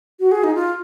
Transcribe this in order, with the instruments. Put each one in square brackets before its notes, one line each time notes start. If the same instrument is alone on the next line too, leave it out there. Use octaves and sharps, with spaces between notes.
[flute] F#4
G#4
D#4
F4